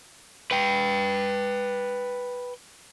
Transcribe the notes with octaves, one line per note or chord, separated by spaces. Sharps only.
B4 G5